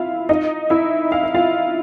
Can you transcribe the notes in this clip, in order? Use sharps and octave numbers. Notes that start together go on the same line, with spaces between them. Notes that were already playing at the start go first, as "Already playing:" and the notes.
Already playing: E4 F4 E5 F5
D#4 D#5
E4 E5
F5
E5
F4 F5